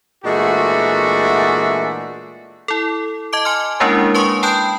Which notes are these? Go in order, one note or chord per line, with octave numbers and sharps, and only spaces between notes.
A#2 E3 G#3 A3 D4 F#4
E4 A4
D#5 A5 D6 D7
G#5 C6 F6
G#3 A#3 C#4 D4 E4 A#4
B4 G#5 C6 C#6 D#6
G5 A5 B5 D#6 F#6 G6